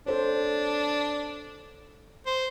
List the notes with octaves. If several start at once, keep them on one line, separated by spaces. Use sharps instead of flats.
D4 A4 C5 C#5
C5